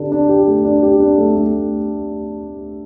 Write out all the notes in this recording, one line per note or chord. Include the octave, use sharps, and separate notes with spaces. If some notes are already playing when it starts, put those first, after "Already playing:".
Already playing: D3 D4 G4
D4
G4
A3
D4
G4
D4
A3
A3